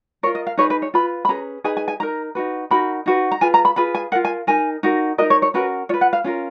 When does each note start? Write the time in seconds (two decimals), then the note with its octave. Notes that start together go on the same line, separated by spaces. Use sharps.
0.23 A#4 C#5
0.26 F4
0.35 D#5
0.47 F5
0.58 D#4 G#4 B4 C#5
0.70 B4
0.82 C#5
0.94 F4 B4 B5
1.25 B5
1.29 C#4 G#4 B4 A#5
1.64 D#4 G#4 B4 G#5
1.77 G#5
1.88 G#5
2.00 D#4 A#4 A#5
2.35 D#4 F#4 B4
2.71 D#4 F#4 A#4 B5
3.06 D#4 F#4 B4
3.32 A#5
3.41 F4 G#4 B4 G#5
3.54 A#5
3.65 B5
3.76 F4 G#4 B4 B5
3.95 G#5
4.12 F4 A#4 F#5
4.25 G#5
4.47 D#4 A#4 G#5
4.83 D#4 F#4 A#4
5.18 D#4 F#4 A#4 D#5
5.30 C#5
5.42 C#5
5.54 C#4 F#4 A#4 B4
5.89 F4 B4 C#5
6.01 F#5
6.13 F5
6.24 C#4 F4 A#4